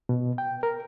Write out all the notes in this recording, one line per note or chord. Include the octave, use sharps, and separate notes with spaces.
B2
G5
A#4